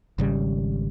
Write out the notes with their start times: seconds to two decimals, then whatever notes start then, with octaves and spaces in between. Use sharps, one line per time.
0.18 G#1 C#3 G3